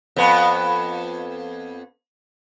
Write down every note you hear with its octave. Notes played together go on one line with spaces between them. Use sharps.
F2 B3